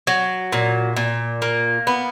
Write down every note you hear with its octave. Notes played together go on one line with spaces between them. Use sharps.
F#3
A#2
A#2
A#3
B3